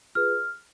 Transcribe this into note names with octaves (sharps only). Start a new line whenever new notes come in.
F4 G#4 B4 F6